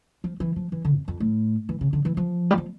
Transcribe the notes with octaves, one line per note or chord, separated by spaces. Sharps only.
F3
E3
F3
E3
D3
F2
F2
A2
E3
C#3
D3
E3
F3
G3
F3